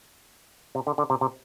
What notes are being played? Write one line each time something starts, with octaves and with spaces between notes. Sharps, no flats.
C3
D3
D3
C3
C3